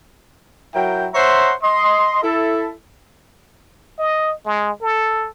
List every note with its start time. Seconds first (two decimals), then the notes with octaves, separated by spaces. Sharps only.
0.75 F#3 E4 A#4 G5
1.14 C5 C#5 E5 F#5 A#5 C6
1.63 D#5 C6
2.22 E4 A4
3.99 D#5
4.45 G#3
4.82 A4